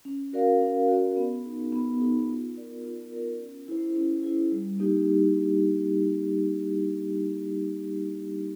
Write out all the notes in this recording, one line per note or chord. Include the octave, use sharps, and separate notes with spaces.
C#4
F#4 A#4 D5 F5
C#4
F#4 A#4 D5 F5
B3
D#4 G#4
B3
D#4 G#4
F4
A#4 D5
F4
A#4 D5
C#4
E4 G#4 C5
C#4
E4 G#4 C5
G3
A#3 D#4 G4